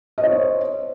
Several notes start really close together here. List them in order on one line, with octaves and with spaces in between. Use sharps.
D#5 C5 C#5